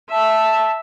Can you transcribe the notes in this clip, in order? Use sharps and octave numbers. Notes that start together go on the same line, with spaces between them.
E5 A5